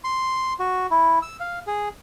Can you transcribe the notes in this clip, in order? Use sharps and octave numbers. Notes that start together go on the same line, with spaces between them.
C6
F#4
E4
E6
F5
G#4